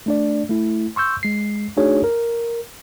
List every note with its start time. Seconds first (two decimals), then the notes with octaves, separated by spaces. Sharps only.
0.06 A3 D4 D5
0.50 A3 E4
0.96 C6 C#6 E6 G6
1.23 G#3 C7
1.77 A3 D4 D#4 F#4 G#4 C#5
2.04 A#4